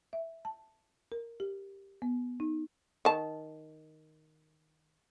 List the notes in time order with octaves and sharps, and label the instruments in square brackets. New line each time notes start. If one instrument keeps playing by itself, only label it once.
[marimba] E5
A5
A#4
G4
B3
D#4
[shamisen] D#3 A5